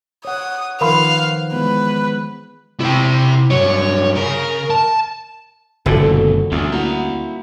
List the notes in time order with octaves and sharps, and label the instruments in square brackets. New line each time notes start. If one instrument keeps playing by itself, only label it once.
[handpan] C#5 F#5 [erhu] D#6
[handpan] D#3 F3 B4 [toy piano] A#4 B5 C6 [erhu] F5
[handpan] E3 G#3 B3 [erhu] B4
[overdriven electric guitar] C3 [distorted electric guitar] E4 G5
[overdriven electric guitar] G2 F#3 [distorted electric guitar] C#5
[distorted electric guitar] C#3 [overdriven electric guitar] A#4
[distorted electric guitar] A5
[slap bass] F#1 A#2 D3 [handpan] G3 F4 F#4 [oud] A4
[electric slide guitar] F#2 B2
[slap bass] D2 [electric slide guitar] G3 C#4 F4
[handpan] A#3 F#4 F#5 [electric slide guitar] E4 A#5